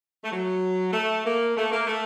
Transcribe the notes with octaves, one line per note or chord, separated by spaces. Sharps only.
A3
F#3
A3
A#3
A3
A#3
A3